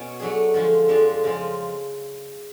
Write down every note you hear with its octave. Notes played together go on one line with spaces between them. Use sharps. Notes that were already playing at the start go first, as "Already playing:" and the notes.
Already playing: B2 C#4 F#4 C#5
F#3 A3 D4 G#4
D3 F3 G#3
F2 F3 G#3 D4
C#3 F3 G#3